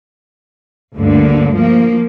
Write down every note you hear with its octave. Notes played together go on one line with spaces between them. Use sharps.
D2 G2 D3 A#3
F3 A#3